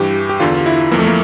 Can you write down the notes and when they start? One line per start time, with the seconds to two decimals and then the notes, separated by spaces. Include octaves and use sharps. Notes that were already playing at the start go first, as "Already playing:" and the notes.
Already playing: G2 E3 G4
0.29 G4
0.40 E2 D3 F4
0.66 E4
0.91 F2 E3 A#3
0.99 A3
1.07 A#3